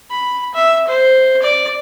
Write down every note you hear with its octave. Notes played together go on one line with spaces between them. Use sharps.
B5
E5
C5
D5